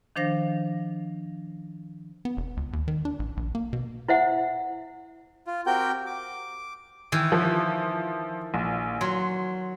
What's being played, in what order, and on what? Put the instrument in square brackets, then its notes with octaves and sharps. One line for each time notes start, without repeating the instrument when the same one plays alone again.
[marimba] D#3 F3 D4 C5 F5 A#6
[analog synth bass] B3
E1
C#2
D#2
D#3
D4
A1
A#1
A#3
B2
[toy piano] E4 C5 E5 F#5
[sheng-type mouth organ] F4
C4 F#4 G4 A#4 G5 G6
D6
[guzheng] D#3 E3
[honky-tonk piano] F3
A#1
[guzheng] F#3 [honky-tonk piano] C6